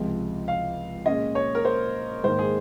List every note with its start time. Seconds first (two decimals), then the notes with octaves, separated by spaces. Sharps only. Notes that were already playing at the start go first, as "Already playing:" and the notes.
Already playing: C#2 C3 F3 G#3
0.48 F5
1.06 A#2 G#3 C#4 D#5
1.35 C#5
1.55 A#4
1.65 C5
2.24 G#2 D#3 A#3 C5
2.39 G#4